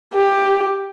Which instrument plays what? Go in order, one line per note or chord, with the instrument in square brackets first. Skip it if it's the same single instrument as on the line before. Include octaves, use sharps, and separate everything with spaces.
[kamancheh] G4